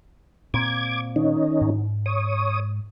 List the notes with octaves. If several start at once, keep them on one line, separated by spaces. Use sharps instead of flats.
A#2 C4 D6 G#6
D#3 C#4 D#4
G#2
C#5 D#6